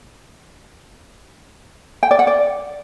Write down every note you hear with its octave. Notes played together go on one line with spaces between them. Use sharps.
G5
D5
F#5
D5